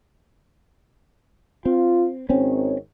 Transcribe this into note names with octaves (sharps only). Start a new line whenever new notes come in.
C4 F4
G#1 D#3 C4 C#4 C#5